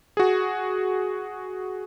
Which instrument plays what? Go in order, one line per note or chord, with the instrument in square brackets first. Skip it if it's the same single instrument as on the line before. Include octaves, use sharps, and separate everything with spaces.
[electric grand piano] F#4 G#4